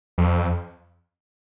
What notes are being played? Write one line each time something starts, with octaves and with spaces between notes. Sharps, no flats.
F2